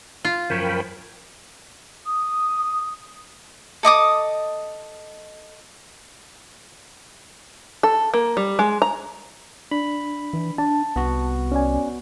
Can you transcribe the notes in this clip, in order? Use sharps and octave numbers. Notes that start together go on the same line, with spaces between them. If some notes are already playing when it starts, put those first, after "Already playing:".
F4
F#2 F3 A#4 C#5 G5 B5
D#6
A4 D#5 D6 D#6
A4
A#3
G3
G#3
A#5
D4 B5
E3
D4 A5
C2 B3 F#4
C#4 D5 G#5